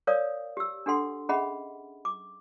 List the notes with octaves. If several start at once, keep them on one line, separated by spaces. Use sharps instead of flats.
A#4 C#5 D5 F5 D#6
G4 E6
D4 G4 A4 F#5 C6
C#4 G#4 D#5 E5 F#5 B5
D6